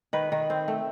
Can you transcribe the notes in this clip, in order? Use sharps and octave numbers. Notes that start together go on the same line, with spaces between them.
D#3 B4
D#3
C4
A3